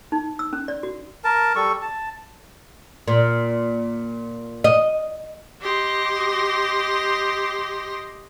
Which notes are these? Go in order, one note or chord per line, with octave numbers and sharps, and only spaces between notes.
D#4
E6
C#4
D5
F#4
A#4 A5
G3 A4 C#6
A5
A#2
D#5
G4 D#5 C6